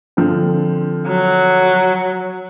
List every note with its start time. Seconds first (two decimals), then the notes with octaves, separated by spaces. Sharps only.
0.17 D3 F3 C4
1.08 F#3